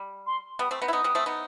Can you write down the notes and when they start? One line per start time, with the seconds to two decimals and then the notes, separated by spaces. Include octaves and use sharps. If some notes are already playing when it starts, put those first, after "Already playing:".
Already playing: G3
0.26 C6
0.59 G3 B3 D#6
0.71 A3 C4
0.82 B3 D#4
0.88 E4
0.93 B3 D#4 D#6
1.04 G3 B3
1.15 A3 C4
1.26 B3 D#4